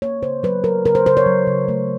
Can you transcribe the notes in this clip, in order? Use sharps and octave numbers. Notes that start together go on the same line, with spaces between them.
A#3 C#5
C#3 C5
F#3 B4
F#3 A#4
C#3 A#4
C5
C#3 C5
C#5
F#3
C#3
A3